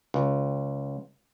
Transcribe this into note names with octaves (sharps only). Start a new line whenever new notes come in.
C#2